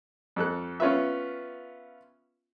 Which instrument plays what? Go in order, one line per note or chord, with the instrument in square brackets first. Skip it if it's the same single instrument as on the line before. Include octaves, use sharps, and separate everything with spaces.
[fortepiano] F2 A4 F#6
B3 C#4 F4 B4 E5